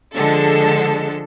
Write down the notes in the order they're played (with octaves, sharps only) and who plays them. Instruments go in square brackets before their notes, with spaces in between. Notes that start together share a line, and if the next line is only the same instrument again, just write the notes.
[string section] D3 F3 G#3 A4